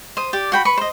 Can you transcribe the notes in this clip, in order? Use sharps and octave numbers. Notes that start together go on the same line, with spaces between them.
C5 D#6
G4 D5
F#4 G5 B5
B4 B5 C#6
C5 D#5